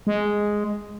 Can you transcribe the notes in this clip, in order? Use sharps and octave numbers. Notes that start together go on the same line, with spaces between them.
G#3